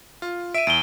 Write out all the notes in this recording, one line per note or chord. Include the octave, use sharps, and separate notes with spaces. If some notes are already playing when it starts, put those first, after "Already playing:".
F4
E5 D7 D#7
E2 D7 G7